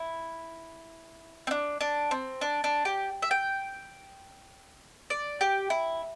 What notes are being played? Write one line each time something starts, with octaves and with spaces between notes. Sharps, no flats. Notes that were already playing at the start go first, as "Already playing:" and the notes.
Already playing: E4
C4
D4
D4
C4
D4
D4
G4
E5
G5
D5
G4
E4